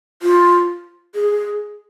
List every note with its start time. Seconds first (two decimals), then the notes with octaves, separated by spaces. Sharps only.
0.22 F4
1.15 G#4